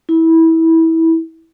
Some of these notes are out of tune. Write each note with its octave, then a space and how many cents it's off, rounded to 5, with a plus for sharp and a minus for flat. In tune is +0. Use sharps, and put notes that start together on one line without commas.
E4 -20